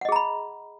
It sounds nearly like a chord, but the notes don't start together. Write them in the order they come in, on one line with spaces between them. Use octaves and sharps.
F#5 D#5 G#4 A#5 B5